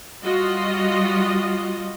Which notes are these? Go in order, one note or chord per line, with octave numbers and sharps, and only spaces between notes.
G3 F4 F#4 D#5